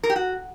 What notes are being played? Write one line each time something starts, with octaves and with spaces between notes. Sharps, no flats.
A#4
G4
F#4